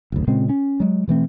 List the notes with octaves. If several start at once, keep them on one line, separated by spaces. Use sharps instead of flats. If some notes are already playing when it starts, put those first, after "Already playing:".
F#1 D2
A#2 C#3 G#3 C4
C#4
F#3 G#3
B2 E3 A3 C4